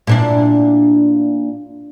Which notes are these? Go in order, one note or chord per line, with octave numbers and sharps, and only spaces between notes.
A#2 D4 E4